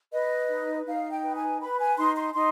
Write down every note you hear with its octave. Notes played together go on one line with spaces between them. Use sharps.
B4 D#5
D#4
D#4 F5
G5
B4
G#5
B4 B5
G#5
D#4 C6
C6
D#4 C6